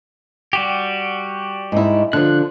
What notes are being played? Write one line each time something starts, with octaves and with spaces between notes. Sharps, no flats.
G3 F#4 G4
G#2 D#4 E4
D3 F3 F#6